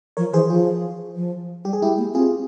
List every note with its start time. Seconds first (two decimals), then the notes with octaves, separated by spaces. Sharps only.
0.17 F3 A#4 C#5
0.33 E3 G#4 C5
0.49 F3 F4 G#4
1.16 F3
1.64 G3 G4
1.73 G#4
1.82 G#3 E4 G4
1.98 A#3
2.14 C4 F4 G#4